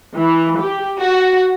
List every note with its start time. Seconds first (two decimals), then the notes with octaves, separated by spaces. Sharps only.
0.15 E3
0.60 G4
0.99 F#4